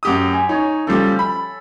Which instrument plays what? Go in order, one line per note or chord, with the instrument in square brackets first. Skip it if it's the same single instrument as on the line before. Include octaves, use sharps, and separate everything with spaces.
[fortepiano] F#2 G4 D#6
[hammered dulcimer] G#5
[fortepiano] D#4 [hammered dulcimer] C#5
[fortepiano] C#3 F3 G3 [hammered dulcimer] A4
[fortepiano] B5